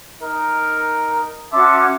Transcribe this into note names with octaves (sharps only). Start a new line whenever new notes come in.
D#4 A#4
C#4 F#4 E5 A5 C6 D6